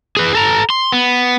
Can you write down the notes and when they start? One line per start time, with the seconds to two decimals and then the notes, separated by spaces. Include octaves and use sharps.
0.17 G#4 B4
0.35 A4 A#5
0.70 C6
0.92 B3